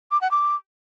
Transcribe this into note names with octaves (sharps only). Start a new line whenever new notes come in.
D6
F#5
D6